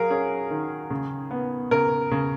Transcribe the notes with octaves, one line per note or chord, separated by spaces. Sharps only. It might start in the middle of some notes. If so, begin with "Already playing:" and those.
Already playing: F#3 G#4 A#4 F5
C#4 G#4
D#3
C#3
B3
C#3 A#4
C#3